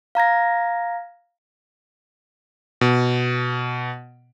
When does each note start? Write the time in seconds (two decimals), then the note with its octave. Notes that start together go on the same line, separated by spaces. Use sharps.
0.15 F5 A#5 G#6 A#6
2.81 B2